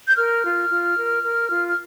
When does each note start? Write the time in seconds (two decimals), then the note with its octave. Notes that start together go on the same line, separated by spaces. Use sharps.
0.08 G6
0.17 A#4 F6
0.44 F4
0.70 F4
0.96 A#4
1.23 A#4
1.49 F4
1.68 F6